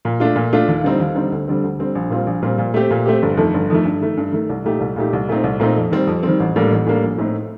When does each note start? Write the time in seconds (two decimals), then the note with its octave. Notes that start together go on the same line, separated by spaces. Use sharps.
0.05 A#2
0.20 A3 D4 F4
0.36 A#2
0.53 A3 D4 F4
0.68 D#2
0.84 D3 G3 C4 D#4
1.00 D#2
1.15 D3 G3 C4 D#4
1.32 D2
1.48 D3 G3 C4
1.64 D2
1.79 D3 G3 C4
1.95 A#1
2.10 A#2 G3 C4 F4
2.27 A#1
2.42 A#2 G3 C4 F4
2.58 A#2
2.74 A3 C4 G4
2.90 A#2
3.06 A3 C4 G4
3.22 G1
3.37 F2 D#3 A3
3.54 G1
3.70 F2 D#3 A3
3.85 G2
4.01 D#3 A3
4.17 G2
4.32 D#3 A3
4.49 C2
4.64 A#2 A3 D#4 G4
4.80 C2
4.96 A#2 A3 D#4 G4
5.13 C2
5.28 A#2 A3 C4 D#4
5.44 C2
5.60 A#2 A3 C4 D#4
5.76 F2
5.91 D#3 G3 C4
6.07 F2
6.23 D#3 G3 C4
6.40 A1
6.56 A2 G3 A#3 D4
6.71 A1
6.87 A2 G3 A#3 D4
7.03 A#1
7.18 A2 A3 C4 D#4